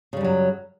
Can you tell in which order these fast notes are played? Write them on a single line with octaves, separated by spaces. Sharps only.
C#3 G3 F#2 F#3